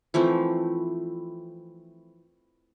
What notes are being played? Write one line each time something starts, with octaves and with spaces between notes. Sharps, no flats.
E3 F3 A3 C4